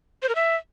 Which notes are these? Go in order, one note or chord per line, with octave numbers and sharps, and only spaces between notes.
C5
A#4
E5